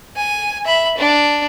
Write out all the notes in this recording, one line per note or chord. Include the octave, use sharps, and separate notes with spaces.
G#5
E5 B5
D4